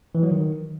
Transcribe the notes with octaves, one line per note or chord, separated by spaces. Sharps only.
E3
F#3
D#3